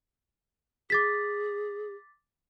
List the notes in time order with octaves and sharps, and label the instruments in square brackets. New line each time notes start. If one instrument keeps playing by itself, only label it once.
[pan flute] G#4 [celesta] D6 A6 B6